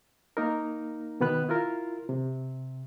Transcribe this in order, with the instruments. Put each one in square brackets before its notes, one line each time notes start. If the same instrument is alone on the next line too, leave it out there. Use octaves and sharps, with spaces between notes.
[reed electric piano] A#3 D#4 A#4
B2 D#3 B3 B4 F#6
E4 F4 A#4
C3